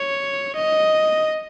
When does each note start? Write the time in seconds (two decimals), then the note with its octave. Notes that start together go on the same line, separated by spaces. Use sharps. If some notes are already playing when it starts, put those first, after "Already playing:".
Already playing: C#5
0.56 D#5